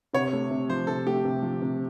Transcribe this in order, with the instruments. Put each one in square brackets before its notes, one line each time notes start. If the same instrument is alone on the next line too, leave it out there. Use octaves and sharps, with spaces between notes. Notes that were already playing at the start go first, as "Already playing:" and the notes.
[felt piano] C3 [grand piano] C#5
[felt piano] A3
C3
[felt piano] F3 [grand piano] C5
[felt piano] C3 [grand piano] A4
[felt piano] A3 [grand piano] G4
[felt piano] C3
F3
C3